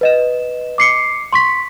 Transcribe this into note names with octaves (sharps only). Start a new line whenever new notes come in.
B4 D#5 E7
D6 C7 C#7
C6 C#6 B6